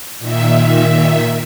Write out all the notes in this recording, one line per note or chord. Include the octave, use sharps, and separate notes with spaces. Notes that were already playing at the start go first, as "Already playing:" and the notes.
A#2 D#3 E5